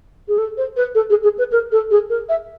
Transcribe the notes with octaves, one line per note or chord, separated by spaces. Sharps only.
G#4
A4
C5
B4
A4
G#4
G#4
B4
A#4
A4
G#4
A#4
E5